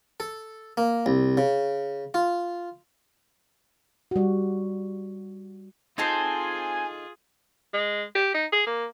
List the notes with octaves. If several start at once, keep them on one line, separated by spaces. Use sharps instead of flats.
A4
A#3
C2
C#3
F4
G3 F#4
C4 D#4 F4 G#4 A4 C5 G#5 A5
G#3
G4
D#4
G#4
A#3